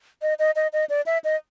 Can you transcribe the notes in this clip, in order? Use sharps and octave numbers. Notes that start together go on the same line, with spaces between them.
D#5
D#5
D#5
D#5
D5
E5
D#5